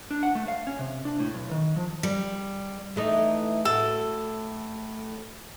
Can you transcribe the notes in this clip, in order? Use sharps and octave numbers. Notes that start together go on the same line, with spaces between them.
D4
F#5
A3
F5
C#4
C3
D4
A2
B1
D#3
F3
G3
E3 A3 D#4
A2 F#4 A4